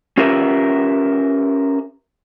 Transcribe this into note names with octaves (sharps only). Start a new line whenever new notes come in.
C#4 F4 G4 A#4 B4 E5